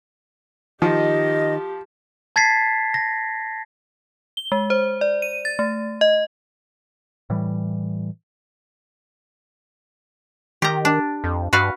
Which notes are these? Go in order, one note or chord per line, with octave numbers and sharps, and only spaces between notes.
D#3 F3 G4 D#5
A5 G#6 A6 B6 C7
A#6
G7
G#3
C5
D5
D#7
A6
A3
D#5
A2 E3 G3
D#3 G4 A#5
D4
F2
G2 F#4 B4 F5